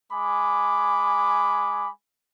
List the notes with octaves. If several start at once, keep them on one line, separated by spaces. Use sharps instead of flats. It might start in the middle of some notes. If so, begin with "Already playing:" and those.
G#3 G#5 B5 D6